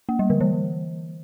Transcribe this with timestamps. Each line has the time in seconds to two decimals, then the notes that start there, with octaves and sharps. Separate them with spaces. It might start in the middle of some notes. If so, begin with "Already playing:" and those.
0.09 A#3
0.19 G3
0.30 D3
0.40 E3